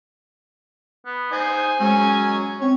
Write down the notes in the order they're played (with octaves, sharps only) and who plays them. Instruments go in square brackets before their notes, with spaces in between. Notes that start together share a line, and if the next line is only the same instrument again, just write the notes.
[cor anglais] B3
[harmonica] D#4 C5 D#5 [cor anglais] G#5
[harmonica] F#3 C#4 [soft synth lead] G#3
[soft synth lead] C4 [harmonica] C#5